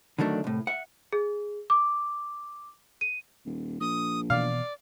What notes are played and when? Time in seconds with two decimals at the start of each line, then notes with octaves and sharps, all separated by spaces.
0.19 D3 D#3 F#3 A3 D4
0.44 C2 A2
0.67 E5 F#5
1.13 G#4
1.70 D6
3.01 D#7
3.45 D#1
3.80 A#1 D#6
4.30 B2 E3 B3 D5 F5